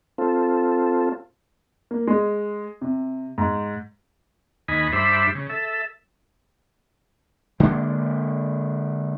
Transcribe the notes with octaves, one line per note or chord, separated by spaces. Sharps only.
C4 F4 A4
A#3
G#3
C3
G#2
D#2 D#5 G#5 B5
G2 D4 C5 E5 B5
C#3
A4 E5
D3 G#3 A#3 D4